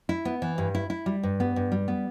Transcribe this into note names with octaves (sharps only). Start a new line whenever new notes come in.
E4
B3
E3
G2
E4
E4
G3
G2
B3
G2
G3
B3